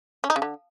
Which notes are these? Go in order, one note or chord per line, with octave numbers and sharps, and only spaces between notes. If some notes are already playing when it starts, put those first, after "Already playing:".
C#4
D#4
C#3
D3